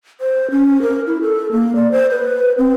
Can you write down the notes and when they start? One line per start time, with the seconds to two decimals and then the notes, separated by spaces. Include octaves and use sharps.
0.21 C5
0.51 C#4
0.82 A#4
1.07 E4
1.22 A4
1.52 A#3
1.76 D5
1.92 C5
2.11 B4
2.58 C4